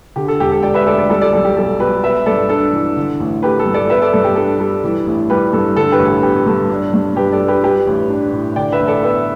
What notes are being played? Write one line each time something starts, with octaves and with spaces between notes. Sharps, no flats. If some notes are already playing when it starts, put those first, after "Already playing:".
D3 G4
A4
E1 G4
A4
E1 D5 G5
B4 E5
D2 A4 D5
A4 D5
G3 A4
A4 D5
B1 A4
G4
B1 A4
B2 G4 B4
B3 B4 E5
G2 A4 D5
D4 A4
E3
D3
A1
A3 G4 B4
A4
G2
A4 D5
B3 B4 E5
A4 D5
G2 A4
G4
D4 A4
G3 A4
E3
A1
G3 G4 B4
G2 A4
D3 A4
G4 B4
A1
A4
B3 G4
G2 A4
D4
G2
G2 G4 B4
A4 D5
G3
G4 B4
G3 G4 B4
A1
D4
A2
D3 D5 G5
B4 E5
A1
A4 D5
B3 B4 E5